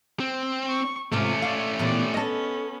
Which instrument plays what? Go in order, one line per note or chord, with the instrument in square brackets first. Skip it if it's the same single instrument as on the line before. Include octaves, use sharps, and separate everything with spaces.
[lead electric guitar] C4
[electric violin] C#6
[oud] G#2 C3 F4 [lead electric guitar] A3 C#4 [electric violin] D6
[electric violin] D5 [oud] F5
[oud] A#2 E3 B3 [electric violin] G4 D5
[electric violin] B3 C#4 [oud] A4 D#5